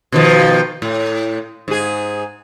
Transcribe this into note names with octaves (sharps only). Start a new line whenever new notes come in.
B2 D#3 F3
A2
G#2 G#4